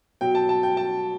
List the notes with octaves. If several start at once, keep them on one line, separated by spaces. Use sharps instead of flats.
B2 F#3 G5
A5
A5
G5
A5